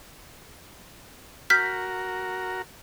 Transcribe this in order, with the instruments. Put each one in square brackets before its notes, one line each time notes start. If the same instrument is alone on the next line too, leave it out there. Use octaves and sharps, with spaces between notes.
[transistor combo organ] F#4 A#4 [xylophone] F6 G6 B6